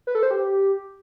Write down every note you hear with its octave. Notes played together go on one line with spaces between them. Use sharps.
B4
A4
C5
G4